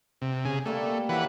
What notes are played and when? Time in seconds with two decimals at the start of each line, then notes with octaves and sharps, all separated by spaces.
0.22 C3
0.45 C#3 G#4
0.65 G3 A3 A#3 D5
1.09 E3 F#3 B4 E5 F#5